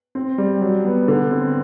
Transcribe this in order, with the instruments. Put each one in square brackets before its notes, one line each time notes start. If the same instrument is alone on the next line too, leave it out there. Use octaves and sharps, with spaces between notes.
[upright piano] C4
G3
F#3
B3
D3
C4